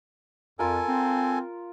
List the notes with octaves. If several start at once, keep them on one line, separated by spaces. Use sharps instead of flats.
F2 F4 A4 A#4 G#5
C4